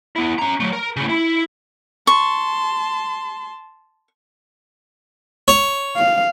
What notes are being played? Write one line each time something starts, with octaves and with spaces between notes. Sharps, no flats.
B3 E4
C#4 A#5
F#3 A3
A#4
A2 C#3
E4
A5 C6 C#6
C#5
F5